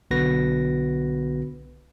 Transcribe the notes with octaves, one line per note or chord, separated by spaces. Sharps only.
B1 D3 B3 F#4 B4 A#6